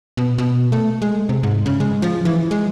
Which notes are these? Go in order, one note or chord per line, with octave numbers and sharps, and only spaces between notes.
B2
B2
A3
G#3
C3
G#2
C#3
G#3
F3
E3
G#3